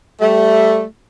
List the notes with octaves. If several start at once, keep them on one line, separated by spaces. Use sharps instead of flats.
G3 A3